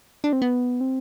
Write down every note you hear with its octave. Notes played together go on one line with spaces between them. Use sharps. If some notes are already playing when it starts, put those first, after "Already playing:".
D4
C4
B3
C4